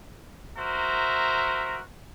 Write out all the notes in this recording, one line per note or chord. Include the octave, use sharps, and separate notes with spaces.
F#4 A#4 C5 E5 A#5